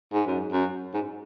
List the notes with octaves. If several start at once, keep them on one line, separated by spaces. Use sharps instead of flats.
G#2
F#2
F#2
G#2